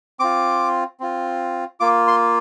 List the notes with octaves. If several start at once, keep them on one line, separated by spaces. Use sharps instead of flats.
C4 F4 D6
C4 F4
A#3 F4 D6
C6